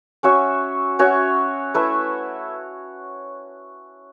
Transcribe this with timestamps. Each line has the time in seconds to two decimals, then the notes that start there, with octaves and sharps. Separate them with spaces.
0.23 C#4 F#4 C#5 E5
0.99 C#4 F#4 C#5 E5
1.74 A3 E4 B4 E5